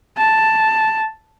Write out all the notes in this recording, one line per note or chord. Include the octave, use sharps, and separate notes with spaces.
A5